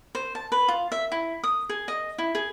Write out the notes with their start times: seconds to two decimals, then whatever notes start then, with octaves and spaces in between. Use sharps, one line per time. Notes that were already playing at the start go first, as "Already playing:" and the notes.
0.15 C5
0.35 A5
0.52 B4
0.68 F4
0.92 E5
1.12 E4
1.44 D#6
1.69 G#4
1.88 D#5
2.18 E4
2.35 G#4